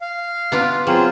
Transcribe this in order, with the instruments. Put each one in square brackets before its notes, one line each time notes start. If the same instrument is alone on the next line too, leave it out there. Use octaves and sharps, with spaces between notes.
[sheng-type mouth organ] F5
[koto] B3 D4 F4
[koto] F#3 [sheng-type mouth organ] C4 F4 G#4